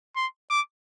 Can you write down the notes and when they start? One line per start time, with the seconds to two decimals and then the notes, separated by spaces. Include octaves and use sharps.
0.16 C6
0.51 D6